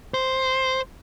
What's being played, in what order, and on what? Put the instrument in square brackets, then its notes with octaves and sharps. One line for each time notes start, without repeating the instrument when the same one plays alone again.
[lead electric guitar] C5